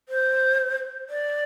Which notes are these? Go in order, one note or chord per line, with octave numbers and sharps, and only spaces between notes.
C5
D5